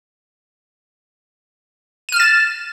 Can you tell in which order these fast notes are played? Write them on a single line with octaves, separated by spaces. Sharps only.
D#7 F6 E7 A6